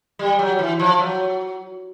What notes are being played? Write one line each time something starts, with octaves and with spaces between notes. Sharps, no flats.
G3
F#3
E3
F3
F#3